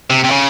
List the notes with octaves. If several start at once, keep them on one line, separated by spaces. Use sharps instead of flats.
C3
C3
C#3